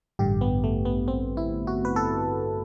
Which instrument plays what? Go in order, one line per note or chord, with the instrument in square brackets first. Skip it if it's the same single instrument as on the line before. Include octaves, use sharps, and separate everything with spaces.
[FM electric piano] A1 G2 D3 G4
B3
A3
B3
C4
E4
F#4
B4
A4